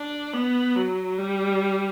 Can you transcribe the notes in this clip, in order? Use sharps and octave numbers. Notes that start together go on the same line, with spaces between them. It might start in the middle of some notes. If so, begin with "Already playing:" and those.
Already playing: D4
B3
F#3
G3